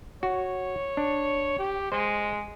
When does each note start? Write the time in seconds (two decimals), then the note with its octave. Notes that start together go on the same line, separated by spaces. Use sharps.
0.23 F#4 C#5
0.97 D4
1.59 G4
1.92 G#3 C5